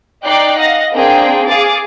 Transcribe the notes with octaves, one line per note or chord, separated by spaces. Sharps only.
D#4 D5 G5 D6 F#6 C7
D#5 F5 F#5 A#6
A#3 C4 D4 G#4 G5
G#4 F5 D6 A6